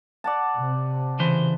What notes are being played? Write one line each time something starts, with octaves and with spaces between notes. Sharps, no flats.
D5 F#5 A5
C3
C#3 E3 C5